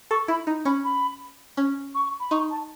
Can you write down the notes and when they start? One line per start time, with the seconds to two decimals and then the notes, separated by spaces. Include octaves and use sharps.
0.10 A4 C#6
0.28 E4 B5
0.47 D#4
0.65 C#4 B5
0.84 B5
1.57 C#4
1.94 C#6
2.19 B5
2.31 D#4 C#6
2.50 A5